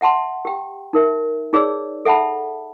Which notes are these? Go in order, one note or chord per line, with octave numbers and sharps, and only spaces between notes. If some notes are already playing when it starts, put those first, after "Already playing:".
E5 F#5 A5 C6
G4 G5
D#4 A#4 E5
D#4 G#4 C#5 D5 E6
A4 E5 F#5 A5 B5